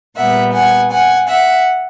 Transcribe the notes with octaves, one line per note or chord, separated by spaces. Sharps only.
A#2 G3 B3 E5 F#5
F#5 G#5
F#5 G#5
E5 F#5